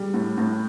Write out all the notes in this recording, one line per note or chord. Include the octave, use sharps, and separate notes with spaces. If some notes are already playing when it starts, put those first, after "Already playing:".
Already playing: G3
A2
A2